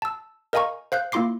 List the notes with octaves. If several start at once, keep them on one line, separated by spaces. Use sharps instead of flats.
A5 E6
A#4 D#5 F5 G#5 A#5 C#6
C5 F5 F#6 G6
A#3 E4 F4 C6 D6 C7